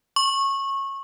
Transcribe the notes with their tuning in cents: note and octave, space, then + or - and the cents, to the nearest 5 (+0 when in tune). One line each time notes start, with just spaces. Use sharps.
C#6 -20